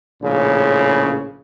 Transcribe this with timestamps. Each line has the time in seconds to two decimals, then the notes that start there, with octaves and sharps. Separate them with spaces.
0.22 A#1 A2 C#3